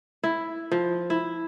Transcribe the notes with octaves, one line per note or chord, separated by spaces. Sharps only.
E4
F3
E4